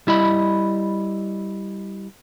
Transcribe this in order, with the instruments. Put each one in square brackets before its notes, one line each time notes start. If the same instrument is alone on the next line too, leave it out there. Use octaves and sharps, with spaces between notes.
[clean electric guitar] G3 E4 D#5 B5